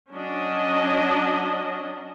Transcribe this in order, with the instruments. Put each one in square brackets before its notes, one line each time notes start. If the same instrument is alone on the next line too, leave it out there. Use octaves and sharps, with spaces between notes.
[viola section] F#3 C#4 D4 D#5